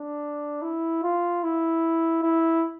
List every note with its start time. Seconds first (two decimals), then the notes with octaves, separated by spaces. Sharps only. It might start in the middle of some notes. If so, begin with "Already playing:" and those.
Already playing: D4
0.62 E4
1.03 F4
1.43 E4
2.23 E4